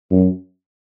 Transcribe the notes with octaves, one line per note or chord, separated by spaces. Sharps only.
F#2